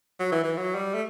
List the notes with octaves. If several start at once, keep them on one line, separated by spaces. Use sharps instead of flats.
F#3
E3
E3
F#3
G3
A3